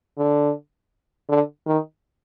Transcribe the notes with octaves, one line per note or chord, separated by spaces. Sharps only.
D3
D3
D#3